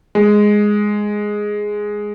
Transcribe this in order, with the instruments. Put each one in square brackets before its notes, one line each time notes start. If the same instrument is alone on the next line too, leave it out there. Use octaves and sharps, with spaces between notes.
[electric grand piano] G#3